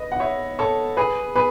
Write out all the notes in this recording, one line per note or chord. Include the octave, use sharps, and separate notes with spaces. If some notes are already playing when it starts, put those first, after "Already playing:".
Already playing: B4 D#5
F#5
C#5 E5
A4 C#5
G#4 B4
G#4 B4